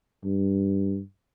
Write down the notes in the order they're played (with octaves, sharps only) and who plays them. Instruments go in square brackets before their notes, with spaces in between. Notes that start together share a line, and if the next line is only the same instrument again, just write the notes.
[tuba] G2